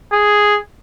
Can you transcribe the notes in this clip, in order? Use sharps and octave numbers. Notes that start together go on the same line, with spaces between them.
G#4